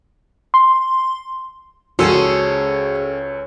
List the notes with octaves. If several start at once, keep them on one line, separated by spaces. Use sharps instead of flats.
C6
C#2 C#4 F#4 G#4 A4 C5 E6 D#7